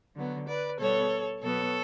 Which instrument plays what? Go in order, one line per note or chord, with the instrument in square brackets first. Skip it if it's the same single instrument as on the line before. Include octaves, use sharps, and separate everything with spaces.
[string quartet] D3 F#3 B3
B4 D5
B2 G3 B3 A4 C#5
B2 F#3 B3 A4 C#5